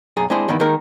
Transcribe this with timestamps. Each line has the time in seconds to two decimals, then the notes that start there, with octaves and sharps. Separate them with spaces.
0.17 B1 F#2 G#4 A#5
0.30 G#3 C4 D4 E4 G#4 C5
0.48 G2 D#3 E3 B3 E4
0.60 D#3 G#3 A#3 D#4 A#4